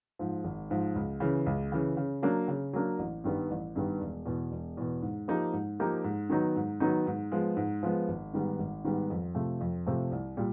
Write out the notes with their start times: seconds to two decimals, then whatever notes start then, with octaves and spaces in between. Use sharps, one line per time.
0.19 G#2 F3
0.44 G#1
0.71 G#2 F3
0.95 C#2
1.20 C#3 E3
1.46 C#2
1.72 C#3 E3
1.97 C#3
2.22 F#3 A#3 D4
2.48 C#3
2.73 F#3 A#3 D4
2.99 A1
3.24 G2 D#3 G3 B3
3.50 A1
3.76 G2 D#3 G3 B3
4.00 E1
4.26 E2 B2
4.52 E1
4.77 E2 B2
5.02 G#2
5.28 F3 A#3 D#4 G4
5.53 G#2
5.79 F3 A#3 D#4 G4
6.04 G#2
6.30 D#3 F#3 B3 D#4
6.56 G#2
6.80 D#3 F#3 B3 D#4
7.07 G#2
7.32 F3 G#3 B3
7.56 G#2
7.83 F3 G#3 B3
8.08 G#1
8.33 G#2 D#3 G3 B3
8.59 G#1
8.84 G#2 D#3 G3 B3
9.10 F2
9.35 C3 F3 A3
9.61 F2
9.86 C3 F3 A3
10.11 C2
10.37 A#2 G3